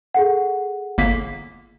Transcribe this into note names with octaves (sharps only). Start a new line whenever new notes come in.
G#4 A4 F#5
G1 A#3 B6